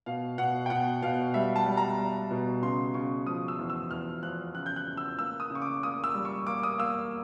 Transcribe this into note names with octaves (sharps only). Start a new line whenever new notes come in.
B2 F5
B2 F#5
G5
B2 F#5
B2 F5
G3 E5
A5
G3
A#5
G3
B2
C#3 C6
C#3 C#6
F3 D#6
E6
E2
E6
E2 F6
F3 F#6
C#3 F#6
G6
F#6
C#3
E6
A#3 E6
D#6
C#3
C#6
D6
A#3 D#6
E6
G3
C#6
A#3 D6
D#6
A#3 E6